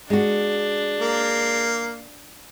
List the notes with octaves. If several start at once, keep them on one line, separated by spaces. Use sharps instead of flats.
G#3 D4 F#4
A#3